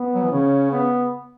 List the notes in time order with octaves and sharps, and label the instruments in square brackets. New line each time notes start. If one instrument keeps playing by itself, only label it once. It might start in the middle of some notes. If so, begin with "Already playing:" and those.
Already playing: [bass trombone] B3
[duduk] F#3
E3
[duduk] C#3 [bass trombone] C#4
[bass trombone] B3